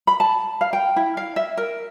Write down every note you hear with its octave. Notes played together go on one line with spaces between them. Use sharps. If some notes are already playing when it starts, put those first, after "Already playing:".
B5
A5
F5
G5
E4
F5
E5
A#4